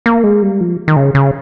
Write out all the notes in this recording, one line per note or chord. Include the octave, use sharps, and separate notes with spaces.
A#3
G#3
G3
F3
D#3
C#3
C#3